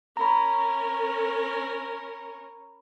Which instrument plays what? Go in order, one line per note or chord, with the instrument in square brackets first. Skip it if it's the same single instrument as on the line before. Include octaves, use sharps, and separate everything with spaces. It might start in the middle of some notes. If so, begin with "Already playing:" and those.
[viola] C#4 A#4 [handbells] A#5 B5